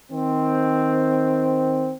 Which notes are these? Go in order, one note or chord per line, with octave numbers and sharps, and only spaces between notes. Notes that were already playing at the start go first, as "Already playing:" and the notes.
D#3 C4